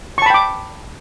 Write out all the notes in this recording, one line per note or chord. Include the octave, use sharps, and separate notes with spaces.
G5 A5 B5 C#6 D6